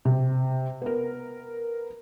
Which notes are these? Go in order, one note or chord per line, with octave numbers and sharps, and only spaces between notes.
C3
B3 A#4